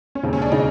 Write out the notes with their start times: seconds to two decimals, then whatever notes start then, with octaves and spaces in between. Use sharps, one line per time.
0.15 C#4
0.23 E1 D#2 C#3 C4
0.33 C#4
0.42 D4
0.52 C#3 D#4